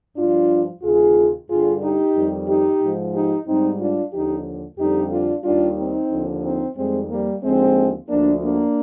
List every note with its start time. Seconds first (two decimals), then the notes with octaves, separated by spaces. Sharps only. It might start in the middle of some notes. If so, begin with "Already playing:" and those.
0.16 G2 F3 D4 F4
0.82 D2 C3 D#3 F4 G#4
1.48 G2 D3 G3 F4 G#4
1.82 D#4 G4
2.15 F2 D#3 G3
2.47 D#4 G4
2.81 G#2 F3
3.13 D#4 G4
3.46 G#2 G3 C4 D#4
3.79 D4 F4
4.12 D#2 D3 F3 D#4 G4
4.78 F2 D3 G3 D#4 G4
5.11 D4 F4
5.44 D#2 D#3 G3 D4 F4
5.78 C4 D#4
6.11 D#2 D3 F3
6.44 C4 D#4
6.76 F2 D#3 G3 G#3 C4
7.09 G3 A#3
7.42 D#2 D3 F3 G#3 C4
8.08 D2 D3 F3 A#3 D4
8.41 A#3 D4